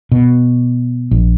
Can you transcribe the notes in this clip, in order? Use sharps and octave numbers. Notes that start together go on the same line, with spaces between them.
B2
A#1